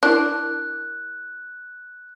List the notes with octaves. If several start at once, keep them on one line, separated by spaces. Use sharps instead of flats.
D4 E4 A#4 F#6